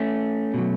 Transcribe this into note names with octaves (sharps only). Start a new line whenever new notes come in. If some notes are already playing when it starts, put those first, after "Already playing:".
Already playing: A3 C#4
B2 F#3